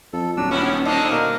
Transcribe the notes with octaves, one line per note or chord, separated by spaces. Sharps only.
F2 A4
D#1 F#3 D4 E6
F#2 A2 B3 C#4 E4
D3 A3 C4 D4 D#4 A4 C6
B2 A#3 A#4